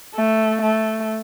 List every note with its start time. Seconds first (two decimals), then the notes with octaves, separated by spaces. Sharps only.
0.15 A3
0.62 A3